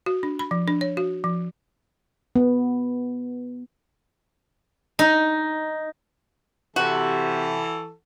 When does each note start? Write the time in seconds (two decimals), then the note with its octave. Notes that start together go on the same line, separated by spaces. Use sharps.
0.06 F#4
0.23 D4
0.39 B5
0.51 F3
0.68 D4
0.81 C#5
0.97 F#4
1.24 F3
2.36 B3
4.99 D#4
6.76 C3 E3 E4 F#4 A4